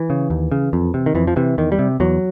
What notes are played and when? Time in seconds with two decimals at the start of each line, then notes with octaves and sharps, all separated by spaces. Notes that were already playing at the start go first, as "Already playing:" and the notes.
Already playing: E3
0.10 C#3
0.30 D#2
0.52 C#3
0.73 F2
0.94 C3
1.06 D#3
1.15 F2 E3
1.27 F3
1.36 C3 E3
1.58 E2 D#3
1.72 G3
1.79 C3
2.00 E2 F#3